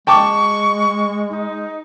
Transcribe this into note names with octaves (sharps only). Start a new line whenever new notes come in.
G#3 G5 A5 C#6 D6
D#4